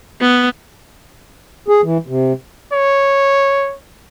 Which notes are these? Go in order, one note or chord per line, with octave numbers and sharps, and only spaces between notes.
B3
G#4
E3
C3
C#5